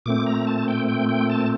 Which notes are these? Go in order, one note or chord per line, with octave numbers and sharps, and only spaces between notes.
A#2 A3 C4 D6
A#5
A5
G5
G5
G5
A5